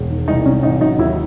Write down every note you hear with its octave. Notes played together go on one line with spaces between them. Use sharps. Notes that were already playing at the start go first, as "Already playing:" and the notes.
Already playing: E1
D#3
C2 D#4
C2 C#4
A1 D#4
F#3 D#4
D#2 E4